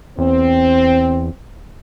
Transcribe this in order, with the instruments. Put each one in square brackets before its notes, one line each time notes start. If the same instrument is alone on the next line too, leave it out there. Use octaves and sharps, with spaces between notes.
[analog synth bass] E2 [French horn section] C4